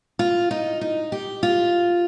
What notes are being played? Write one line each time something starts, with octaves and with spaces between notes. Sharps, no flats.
F4
D#4
D#4
G4
F4